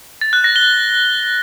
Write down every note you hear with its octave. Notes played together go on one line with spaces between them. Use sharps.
A6
F#6
A#6
G7